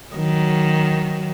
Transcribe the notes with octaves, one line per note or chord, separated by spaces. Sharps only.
D#3 F#3